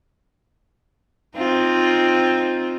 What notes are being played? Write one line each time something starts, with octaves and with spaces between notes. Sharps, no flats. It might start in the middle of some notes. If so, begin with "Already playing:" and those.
C4 D#4 F4